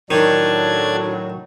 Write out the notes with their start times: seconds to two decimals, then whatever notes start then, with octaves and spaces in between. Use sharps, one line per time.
0.11 A2 D#3 F#3 D4 G#6